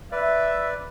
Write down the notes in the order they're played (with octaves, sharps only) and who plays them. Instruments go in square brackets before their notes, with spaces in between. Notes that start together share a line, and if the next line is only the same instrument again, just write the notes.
[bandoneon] B4 D5 [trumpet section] E5